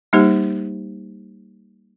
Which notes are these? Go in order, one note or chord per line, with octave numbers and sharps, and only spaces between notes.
G3 A#3 D#4 G4 C5